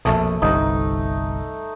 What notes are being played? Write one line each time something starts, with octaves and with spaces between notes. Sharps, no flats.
A#1 F2 B2 A3 D#6
G1 C2 G2 D#4